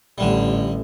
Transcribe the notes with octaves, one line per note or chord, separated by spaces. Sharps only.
A1 D3 G3